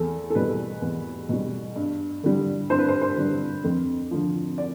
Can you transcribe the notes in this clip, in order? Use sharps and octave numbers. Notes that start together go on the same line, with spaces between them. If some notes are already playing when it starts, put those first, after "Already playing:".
Already playing: E2 A4
A4
B2 G3 B4
E2
B2 G3
G2
D3 G3
G2 C5
B4
C5
C5
D3 G3
F2
D3 F3
D5